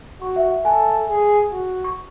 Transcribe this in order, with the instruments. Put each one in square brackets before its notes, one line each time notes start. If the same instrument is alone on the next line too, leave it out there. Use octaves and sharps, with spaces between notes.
[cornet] F#4 [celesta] C#6
[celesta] E5
F#5
[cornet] A4 [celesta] G#5
[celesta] A5
[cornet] G#4
F#4
[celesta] C#6